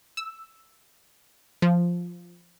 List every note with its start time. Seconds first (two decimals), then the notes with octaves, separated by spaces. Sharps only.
0.17 E6
1.62 F3